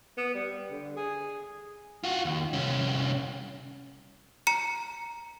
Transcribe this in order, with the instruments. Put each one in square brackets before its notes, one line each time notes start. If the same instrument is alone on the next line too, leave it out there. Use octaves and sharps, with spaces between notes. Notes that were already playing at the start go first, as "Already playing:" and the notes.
[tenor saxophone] B3
G3
D3
G#4
[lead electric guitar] F4 F#4
D#2
C2 C#4
[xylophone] A#5 C#7